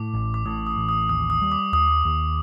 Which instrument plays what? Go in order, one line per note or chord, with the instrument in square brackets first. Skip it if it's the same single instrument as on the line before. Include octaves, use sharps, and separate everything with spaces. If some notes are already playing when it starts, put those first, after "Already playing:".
Already playing: [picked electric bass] A2 [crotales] D6
[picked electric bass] A1
[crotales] D6
[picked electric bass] A2 [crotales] D#6
[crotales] D#6
[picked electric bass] A1
[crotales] D#6
[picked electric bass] D#2 [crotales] D#6
[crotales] D#6
[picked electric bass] G3
[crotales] D6
[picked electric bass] D#2 [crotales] D#6
[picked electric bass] D#2